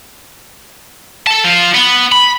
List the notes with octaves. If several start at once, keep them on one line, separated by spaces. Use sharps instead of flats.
A4 A5
F3 F4
B3
B5